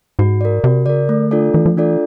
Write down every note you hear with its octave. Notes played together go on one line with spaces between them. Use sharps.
G#2 F#4
A#4 D5
C3 F#4
C#3 A#4 D5
D3 A3
D4 F4 A4 D5
E3 A3
F3
E3 D4 F4 A4 D5